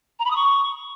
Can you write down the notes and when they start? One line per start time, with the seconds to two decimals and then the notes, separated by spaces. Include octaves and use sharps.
0.19 A#5
0.25 B5
0.30 D#6
0.36 C#6